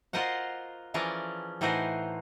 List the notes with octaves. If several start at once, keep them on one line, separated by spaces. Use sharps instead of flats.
F4 F#4 A#4 C5 D#5 F#5
E3 F3 C#4 G#4 A#4 D5
A2 E3 D#4 F#4 A#4 C5